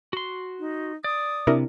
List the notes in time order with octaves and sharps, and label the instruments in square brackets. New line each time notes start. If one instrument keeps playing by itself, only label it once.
[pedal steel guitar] F#4 C6
[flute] D#4
[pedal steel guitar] D5 [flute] D#6
[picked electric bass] C3 [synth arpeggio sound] D4 E4 A#4